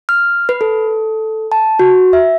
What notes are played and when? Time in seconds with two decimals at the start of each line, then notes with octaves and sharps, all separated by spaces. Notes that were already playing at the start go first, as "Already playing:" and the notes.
0.09 F6
0.49 B4
0.61 A4
1.52 A5
1.79 F#4
2.13 E5